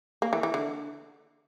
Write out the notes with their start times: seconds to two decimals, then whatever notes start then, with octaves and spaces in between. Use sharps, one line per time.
0.22 A#3
0.33 E3
0.43 E3
0.54 D3